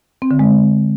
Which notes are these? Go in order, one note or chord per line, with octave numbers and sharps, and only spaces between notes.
C4
D3
G#3